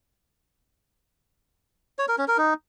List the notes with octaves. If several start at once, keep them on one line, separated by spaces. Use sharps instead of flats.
C#5
A#4
C#4
A#4
D#4